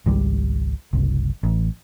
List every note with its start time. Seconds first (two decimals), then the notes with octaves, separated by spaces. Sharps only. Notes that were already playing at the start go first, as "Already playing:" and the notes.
0.06 G#1 C#2 G3
0.93 F#1 C2
1.43 A1